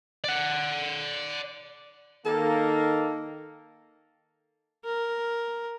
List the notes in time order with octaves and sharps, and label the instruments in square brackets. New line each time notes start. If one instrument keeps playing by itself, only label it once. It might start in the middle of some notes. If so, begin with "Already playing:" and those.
[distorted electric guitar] D5 F#5
[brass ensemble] D#3 A#3 [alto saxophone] A4
[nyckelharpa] A#4